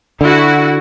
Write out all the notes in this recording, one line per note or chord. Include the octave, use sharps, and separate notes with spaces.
D3 E4 F#4